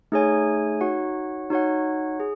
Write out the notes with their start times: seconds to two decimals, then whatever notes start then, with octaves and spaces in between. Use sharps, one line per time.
0.12 A3 D#4 G#4 C#5 G#5
0.81 D#4 F#4 C#5 F#5
1.50 D#4 F#4 C#5 F#5
2.20 G#4